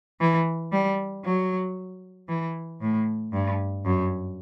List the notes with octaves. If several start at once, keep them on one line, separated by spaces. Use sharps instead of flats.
E3
G3
F#3
E3
A2
G2
F#2